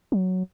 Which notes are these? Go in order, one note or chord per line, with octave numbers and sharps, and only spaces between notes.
F#3